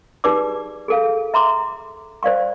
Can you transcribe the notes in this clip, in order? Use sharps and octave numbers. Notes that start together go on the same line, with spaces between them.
D#4 G4 G#4 B4 D5 D6
G#4 A4 F5
E5 A#5 C6 D6
C5 D5 F5 C#6